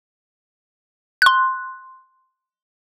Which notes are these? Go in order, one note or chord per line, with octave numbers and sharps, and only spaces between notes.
C6 F#6